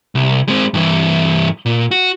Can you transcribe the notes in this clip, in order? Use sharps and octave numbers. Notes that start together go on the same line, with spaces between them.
C2
G#3 C4
G2 E3
A#2
F#4